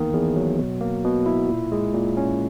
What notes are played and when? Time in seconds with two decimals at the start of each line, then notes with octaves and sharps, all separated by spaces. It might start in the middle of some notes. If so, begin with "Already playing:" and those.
Already playing: E2 D#3 A#3
0.14 E2
0.36 F#3
0.59 B2
0.81 A#3
1.04 B2
1.26 E4
1.48 A#2
1.72 G#3
1.94 A#2
2.17 C#4